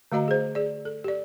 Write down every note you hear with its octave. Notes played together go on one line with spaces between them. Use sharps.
D3 A3 F#4 D#5 A#5
G#4 C5
G#4 D5
A4
G4 D5